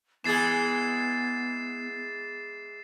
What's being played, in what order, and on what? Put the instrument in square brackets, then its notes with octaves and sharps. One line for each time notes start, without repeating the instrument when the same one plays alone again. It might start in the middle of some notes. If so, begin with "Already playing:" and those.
[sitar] E3 G#3 G#4 [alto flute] B3 [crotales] A6 C7 E7